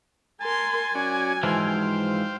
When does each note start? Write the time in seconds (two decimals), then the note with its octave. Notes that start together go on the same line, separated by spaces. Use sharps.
0.41 A#4 G#5 A5 C6
0.95 F#3 C#4 F#4 D5
1.43 G#2 E3 F3 C5 F5 G5